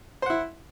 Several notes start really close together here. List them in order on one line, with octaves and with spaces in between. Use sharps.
C5 F#5 E4